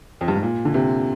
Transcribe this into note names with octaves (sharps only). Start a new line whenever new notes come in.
F2
G2
G#2
A#2
D3
C3